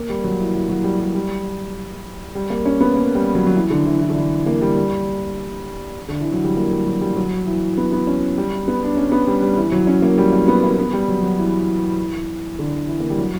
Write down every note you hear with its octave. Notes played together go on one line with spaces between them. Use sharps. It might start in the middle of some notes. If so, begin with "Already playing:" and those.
Already playing: A#3
G3
F#3
E3
E3
F#3
G3
G3
G3
G3
A#3
C#4
B3
A#3
G3
F#3
F#3
E3
D3
E3
E3
D3
E3
A#3
G3
G3
D3
E3
F#3
G3
A#3
G3
F#3
G3
F#3
E3
B3
B3
C#4
G3
B3
D4
C#4
B3
G3
G3
E3
F#3
C#4
A#3
G3
A#3
B3
A#3
B3
G3
F#3
F#3
E3
D3
E3
A#3
G3
F#3